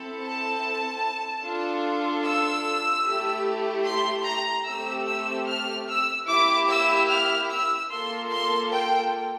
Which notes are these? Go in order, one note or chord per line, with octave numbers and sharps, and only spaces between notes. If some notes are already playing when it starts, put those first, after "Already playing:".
Already playing: C4 E4 A4
A5
D4 F4 A4
E6
A3 E4 G4
C6
A#5
A3 C4 G4 E6
E6
F6
E6
A#3 E4 G4 D6
E6
F6
E6
A#3 F4 A4 C6
C6
G5